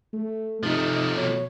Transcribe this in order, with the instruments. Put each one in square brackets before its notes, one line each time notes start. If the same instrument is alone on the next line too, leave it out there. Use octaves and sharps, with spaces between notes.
[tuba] A3
[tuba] C3 [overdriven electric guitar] F3 A3 [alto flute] D#4
[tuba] B2 [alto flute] C#5